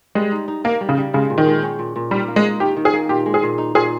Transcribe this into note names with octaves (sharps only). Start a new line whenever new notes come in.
G3 G#3
D#4
D#4
A#3 D#4
G3
C#3
G3
C#3 G#3
A#2
D#3
G#3
C#4
A#2
A#2
G3 D#4
A#3
G#3
D#4
D#3 G4
D#3
G#4
A#3
A#2 G4
G#3
G#4
A#2
D#4
A#2 G#4